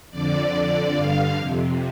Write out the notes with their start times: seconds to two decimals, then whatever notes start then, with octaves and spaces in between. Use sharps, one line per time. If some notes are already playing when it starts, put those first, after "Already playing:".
0.11 F2 D3 D5
0.53 F2 D3
0.94 G2 D3 F5
1.34 F2 C3